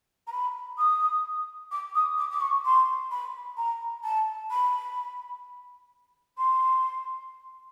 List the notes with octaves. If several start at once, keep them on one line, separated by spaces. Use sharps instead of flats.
A#5
B5
D#6
D6
D#6
D6
D6
C#6
C6
B5
A#5
A5
B5
C6